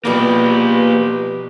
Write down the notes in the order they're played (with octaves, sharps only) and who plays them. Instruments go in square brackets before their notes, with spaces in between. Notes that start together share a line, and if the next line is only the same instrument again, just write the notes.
[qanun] B2 G3 D5 [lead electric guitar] F3 A#3 [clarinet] G4 [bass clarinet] B4